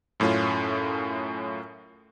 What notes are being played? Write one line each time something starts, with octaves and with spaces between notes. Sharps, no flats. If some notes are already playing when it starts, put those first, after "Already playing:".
F#2 A2 A3 C#4 F4